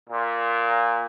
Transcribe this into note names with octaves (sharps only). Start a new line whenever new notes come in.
A#2